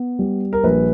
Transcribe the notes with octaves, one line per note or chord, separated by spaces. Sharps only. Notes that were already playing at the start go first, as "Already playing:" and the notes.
Already playing: B3
G3
A#4
A#1 B4